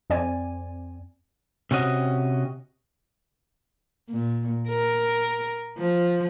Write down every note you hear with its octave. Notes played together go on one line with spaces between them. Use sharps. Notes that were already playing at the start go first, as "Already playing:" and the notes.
F2 C4 D5 G#5
C3 C#4 F#4 D#5
A#2
A#4
F3